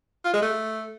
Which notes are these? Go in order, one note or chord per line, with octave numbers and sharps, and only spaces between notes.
F4
G#3
A3